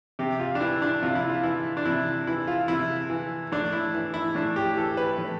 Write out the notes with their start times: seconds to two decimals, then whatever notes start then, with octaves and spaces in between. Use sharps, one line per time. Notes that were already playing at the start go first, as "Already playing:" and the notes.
0.19 C3 G4
0.40 F4
0.55 D4
0.61 E3 E4
0.82 D4
1.02 C3 F4
1.15 E4
1.29 F4
1.43 E3 E4
1.77 D4
1.85 C3 E4
2.27 E3 E4
2.47 F4
2.68 C3 E4
3.10 E3
3.52 A2 D4
3.72 E4
3.94 E3
4.14 E4
4.35 A2 D4
4.56 G4
4.77 E3 A4
4.97 B4
5.18 A2